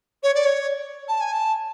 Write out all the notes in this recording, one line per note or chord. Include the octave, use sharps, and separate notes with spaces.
C#5
D5
C#5
A5
G#5
A5